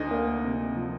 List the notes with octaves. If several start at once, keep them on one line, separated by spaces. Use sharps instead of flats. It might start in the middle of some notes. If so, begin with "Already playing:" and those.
Already playing: D2 D#4
A#3
C3
F3